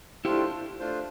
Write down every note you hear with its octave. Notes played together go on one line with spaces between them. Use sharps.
A3 D4 E4 F4 G4 C5
A3 D4 F4 C5